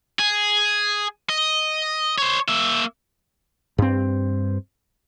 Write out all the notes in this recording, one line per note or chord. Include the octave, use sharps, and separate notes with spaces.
G#4
D#5
C5 C#5
A#3 E5
G2 C4